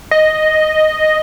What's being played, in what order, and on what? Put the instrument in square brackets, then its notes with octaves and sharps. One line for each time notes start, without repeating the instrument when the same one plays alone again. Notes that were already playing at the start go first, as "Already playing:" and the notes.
[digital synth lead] D#5